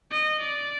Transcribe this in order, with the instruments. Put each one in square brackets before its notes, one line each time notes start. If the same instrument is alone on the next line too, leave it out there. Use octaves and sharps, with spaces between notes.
[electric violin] D#5
D5